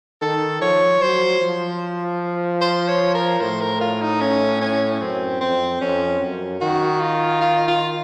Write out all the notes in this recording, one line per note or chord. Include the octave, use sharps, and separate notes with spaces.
D#3 A4
F3 C#5
F#3 C5
F3
C5
C#5
A#4
A2 C5
A#4
F4
D#4
C#4
C#4
F#2 C4
F2 C4
F2 C#4
F#2
D#3 F#4
F4
F4
F4